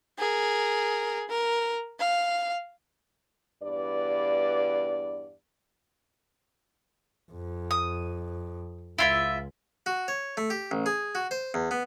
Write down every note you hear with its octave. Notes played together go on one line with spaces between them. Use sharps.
G#4 A#4
A#4
F5
E2 G2 B4 D5
F2
D#6
C#2 E4 F4 E5
F#4
C#5
A3
G4
A1
G#4
F#4
C5
E2
B3